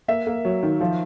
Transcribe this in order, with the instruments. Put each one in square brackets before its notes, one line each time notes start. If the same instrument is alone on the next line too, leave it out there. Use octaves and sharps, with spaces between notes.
[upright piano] A#3 E5
A#3
F#3
D#3
F3